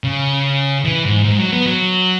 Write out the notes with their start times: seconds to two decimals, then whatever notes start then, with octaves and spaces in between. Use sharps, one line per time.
0.04 C#3
0.85 E3
1.05 G#2
1.25 G#2
1.38 F#3
1.52 B3
1.66 F#3